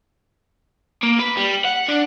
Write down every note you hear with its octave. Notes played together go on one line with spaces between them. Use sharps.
A#3
B4
G3
F#5
D4